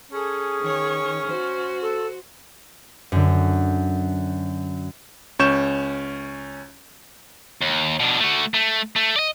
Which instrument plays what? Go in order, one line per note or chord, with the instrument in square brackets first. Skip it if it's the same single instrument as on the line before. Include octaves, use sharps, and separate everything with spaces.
[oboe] C#4 [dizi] G#4 [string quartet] A4
[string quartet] D#3 C#5
F#4 C5
[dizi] A4
[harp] F#2 D3
[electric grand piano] C#2 C#4 C#6 G6 E7
[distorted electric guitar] D#2
B2 D4
A3 F#4
A3
A3
D5 D#5